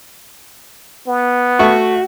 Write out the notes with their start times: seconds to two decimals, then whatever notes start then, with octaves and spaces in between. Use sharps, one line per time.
1.08 B3
1.59 A3 F#4 C#6